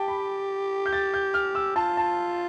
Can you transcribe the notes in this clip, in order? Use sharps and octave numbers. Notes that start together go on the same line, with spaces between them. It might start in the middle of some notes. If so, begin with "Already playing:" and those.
Already playing: G4 G5 A5
B5
G6
A6
G6
F6
E6
F4 A5
A5